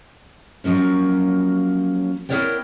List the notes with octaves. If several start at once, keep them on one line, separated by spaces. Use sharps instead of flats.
F3 F#3 A#3 C#4
B3 E4 A#4 C#5 D5 G5